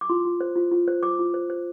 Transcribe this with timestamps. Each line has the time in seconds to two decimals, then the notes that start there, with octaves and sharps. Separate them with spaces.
0.01 D6
0.09 F4 C6
0.25 F4
0.41 C5
0.56 F4
0.71 F4
0.88 C5
1.03 C5 D6
1.19 F4
1.34 C5
1.50 C5